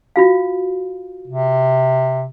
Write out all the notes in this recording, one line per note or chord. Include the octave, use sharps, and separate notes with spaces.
F4 F#4 F5
C3